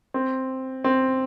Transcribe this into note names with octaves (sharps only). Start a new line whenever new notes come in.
C4
C4